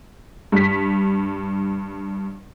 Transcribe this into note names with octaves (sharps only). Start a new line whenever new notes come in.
G2 B6